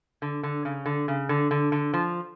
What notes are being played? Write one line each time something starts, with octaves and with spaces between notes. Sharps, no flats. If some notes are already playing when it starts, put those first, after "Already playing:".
D3
D3
C#3
D3
C#3
D3
D3
D3
F3